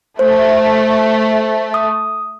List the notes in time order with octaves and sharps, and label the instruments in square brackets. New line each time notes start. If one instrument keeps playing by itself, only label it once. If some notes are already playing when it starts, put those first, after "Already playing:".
[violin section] A3 [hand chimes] C5
[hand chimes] D#6